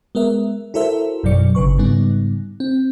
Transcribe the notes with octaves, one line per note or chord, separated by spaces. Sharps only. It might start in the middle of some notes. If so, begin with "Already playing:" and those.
G#3 B3 A#4 E5
E4 F#4 A4 A#4 C5 E5
A1 F#2 B2 F#3 D5 C#7
G1 C#3 B4 C#6
G#2 C#3 G3 B3 D#4
C4